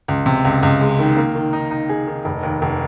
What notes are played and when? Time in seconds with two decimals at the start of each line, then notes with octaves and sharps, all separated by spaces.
0.08 C#2
0.26 C3
0.45 C#2
0.63 C#2
0.81 G#3
0.99 D#3
1.17 A#3
1.35 D#3
1.53 D#4
1.71 D#4
1.89 G#4
2.07 D#3
2.25 F1
2.43 D#2
2.62 F1